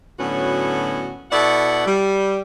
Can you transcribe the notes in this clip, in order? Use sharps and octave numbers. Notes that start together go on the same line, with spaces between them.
A2 D3 F#3 B3 C#4 F#4
B2 E4 A4 D5 F#5
G3